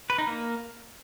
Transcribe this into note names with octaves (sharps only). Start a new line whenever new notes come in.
B4
D#4
A#3